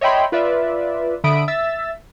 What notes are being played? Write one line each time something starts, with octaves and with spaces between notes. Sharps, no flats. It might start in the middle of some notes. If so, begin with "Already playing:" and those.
C#5 D#5 E5 G5 B5 C6
F4 B4 D5 E5
D3 E5 B5 D#6 D7
E5 E6 A6